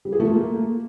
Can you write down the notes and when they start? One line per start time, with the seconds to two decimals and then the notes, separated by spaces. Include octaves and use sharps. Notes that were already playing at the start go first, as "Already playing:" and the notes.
0.05 G3
0.12 G#4
0.20 A3
0.27 F4
0.34 A#3